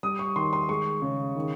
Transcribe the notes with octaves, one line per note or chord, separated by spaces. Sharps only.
G3 D#6
C#6
D#3 C6
C6
G#3 C#6
C#3
D#3